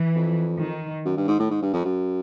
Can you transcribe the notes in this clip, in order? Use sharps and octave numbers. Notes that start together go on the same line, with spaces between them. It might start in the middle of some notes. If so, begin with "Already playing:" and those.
Already playing: E3
F2
D#3
F#2
G2
G#2
A2
G#2
G2
F2
F#2